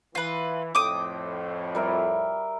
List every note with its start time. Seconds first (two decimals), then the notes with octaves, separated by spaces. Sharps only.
0.15 E3 F4 B4
0.75 F2 A2 G5 D6 D#6
1.75 G3 A#4 E5